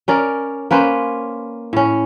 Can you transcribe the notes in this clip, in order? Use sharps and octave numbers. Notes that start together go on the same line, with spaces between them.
C#4 A#4 D5
A#3 C#4 B4 C5
A2 C#4